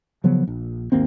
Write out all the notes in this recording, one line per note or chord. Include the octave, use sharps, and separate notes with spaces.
C#3 F3 F#3 B3
A#1
G#1 D#2 A#3 C4